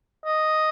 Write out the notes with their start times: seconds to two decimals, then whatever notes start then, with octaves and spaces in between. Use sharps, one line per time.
0.26 D#5